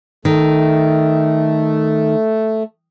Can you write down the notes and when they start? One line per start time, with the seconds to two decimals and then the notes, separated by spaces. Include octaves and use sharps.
0.25 D#3 A3